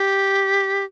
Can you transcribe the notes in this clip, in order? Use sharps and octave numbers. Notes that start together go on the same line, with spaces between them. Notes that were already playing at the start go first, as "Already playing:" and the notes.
Already playing: G4